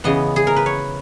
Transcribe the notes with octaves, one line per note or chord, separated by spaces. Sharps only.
C#3 E3 B3 D#5
G#4
A#4
B4
C#5